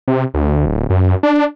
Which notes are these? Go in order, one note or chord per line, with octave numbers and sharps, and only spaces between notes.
C3
D2
D1
F#2
D4